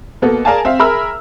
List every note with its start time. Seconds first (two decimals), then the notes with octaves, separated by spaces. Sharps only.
0.22 B2 A#3 B3 A4
0.45 G#4 A#4 D5 F5 G#5 A5
0.65 C4 E5 F5
0.79 G#4 A#4 E5 B5 E6 F6